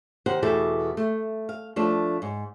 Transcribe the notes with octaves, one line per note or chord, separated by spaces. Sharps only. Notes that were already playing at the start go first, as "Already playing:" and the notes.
D#3 G4 C5 F#5
E2 B2 A3 E4 G4 A4
A3
F5
F3 A3 D4
G#2